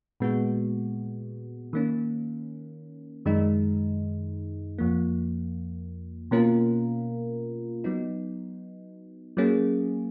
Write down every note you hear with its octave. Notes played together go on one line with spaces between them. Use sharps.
A#2 G#3 B3 F#4
D#3 A#3 C#4
F#2 D#3 G#3 D#4
F2 F3 A#3
B2 A#3 C#4 F4 A#4
F#3 B3 D#4
F#3 A#3 C#4 G#4